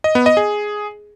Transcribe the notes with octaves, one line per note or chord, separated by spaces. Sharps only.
D#5
B3
D#5
G#4